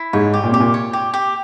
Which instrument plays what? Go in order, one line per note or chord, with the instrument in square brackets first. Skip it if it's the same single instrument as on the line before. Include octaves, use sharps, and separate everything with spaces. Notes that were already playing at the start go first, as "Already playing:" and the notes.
Already playing: [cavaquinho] E4
[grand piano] G#2 [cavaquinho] C#5
[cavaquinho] G4
[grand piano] A#2
[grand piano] C3 [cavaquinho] G4
[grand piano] A#2
[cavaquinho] C#5
G4
G4